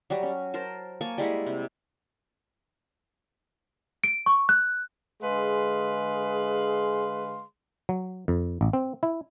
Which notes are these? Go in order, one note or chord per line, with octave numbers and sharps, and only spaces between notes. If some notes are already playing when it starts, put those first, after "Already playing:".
F#3 G3 F#4
C#4
A#4 C5 A5
A#3 G#5 A5 C#6
G3 G#3 E4 F#5
C3
D7
C#6
F#6
D3 G#3 G#4 B4 F5 C6
F#3
F2
A1
C4
E4